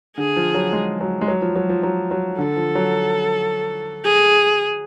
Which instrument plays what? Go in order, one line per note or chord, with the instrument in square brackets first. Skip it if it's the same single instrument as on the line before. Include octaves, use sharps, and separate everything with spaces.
[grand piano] D3 [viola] G#4
[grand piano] F3
F#3
G#3
F#3
G#3
F#3
F3
F#3
F3
F#3
F#3
[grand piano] D3 [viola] A4
[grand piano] F3
F#3
[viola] G#4